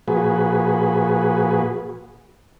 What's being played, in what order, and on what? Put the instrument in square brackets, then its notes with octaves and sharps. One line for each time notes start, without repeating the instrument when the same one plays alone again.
[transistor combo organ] A#2 F3 F#4 G#4 B4